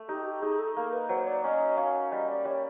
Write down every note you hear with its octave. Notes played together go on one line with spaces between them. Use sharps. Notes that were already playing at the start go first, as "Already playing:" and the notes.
Already playing: A3
D#4 G4
G4
D#4 G#4
A4
A#3 A#4
B4
F#3 C5
D5
C#4 D#5
C#4 F5
G3 D#5
D5
G3 C#5